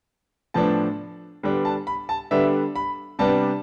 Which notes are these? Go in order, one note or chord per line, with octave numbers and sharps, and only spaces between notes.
A2 F3 B3 D4 A5
D3 G3 B3 D4 B4
A5
B5
A5
D3 G3 B3 D4 E5
B5
C3 G3 B3 D4 A5